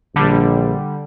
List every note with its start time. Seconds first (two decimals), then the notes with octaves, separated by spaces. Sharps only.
0.16 A#1 D3 G3